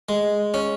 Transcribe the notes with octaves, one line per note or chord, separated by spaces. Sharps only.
G#3
C#4